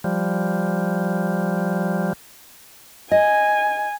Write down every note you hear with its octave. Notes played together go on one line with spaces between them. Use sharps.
F3 G3
D#5 G#5